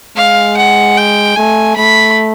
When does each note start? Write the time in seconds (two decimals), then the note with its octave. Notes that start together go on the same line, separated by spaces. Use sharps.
0.16 G#3 F5
0.57 F#5
0.97 G5
1.36 A3 G#5
1.76 A3 B5